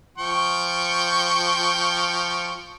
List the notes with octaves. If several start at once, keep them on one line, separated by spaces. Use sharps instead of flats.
F3 G5 C#6